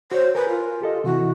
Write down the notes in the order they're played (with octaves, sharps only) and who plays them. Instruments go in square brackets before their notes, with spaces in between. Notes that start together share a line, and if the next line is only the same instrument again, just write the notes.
[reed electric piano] F#4 C#5 [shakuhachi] C5
[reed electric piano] A#4 G#5 [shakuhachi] B4
[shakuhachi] F4
[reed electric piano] G4 A4 D#5
[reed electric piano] C3 E3 E4 [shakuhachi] F#4